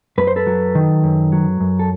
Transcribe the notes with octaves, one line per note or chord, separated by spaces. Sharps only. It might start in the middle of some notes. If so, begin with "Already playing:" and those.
F#2 B4
C5
A4 B4
F#3
D#3
F#2
F#3
F#2
A4